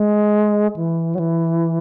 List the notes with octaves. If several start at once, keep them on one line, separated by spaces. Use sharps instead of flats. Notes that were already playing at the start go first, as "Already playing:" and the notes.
Already playing: G#3
E3
F#3
E3